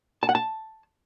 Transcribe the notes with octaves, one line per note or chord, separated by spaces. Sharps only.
A5
F#5
A5